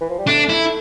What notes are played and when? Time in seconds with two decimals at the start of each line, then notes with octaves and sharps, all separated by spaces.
0.01 E3
0.10 F3
0.19 G3
0.27 A3 D4
0.50 E4